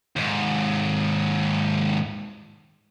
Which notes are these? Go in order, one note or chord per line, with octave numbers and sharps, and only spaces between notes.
D#2 G#2